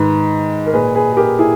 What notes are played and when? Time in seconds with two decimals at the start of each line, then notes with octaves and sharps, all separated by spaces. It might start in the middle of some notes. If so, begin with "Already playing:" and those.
Already playing: G#2 D#3 B4
0.67 A#4
0.73 A#2 G#4 B4
0.95 G#4 B4
1.12 G#4
1.17 G4 A#4
1.39 E4 G#4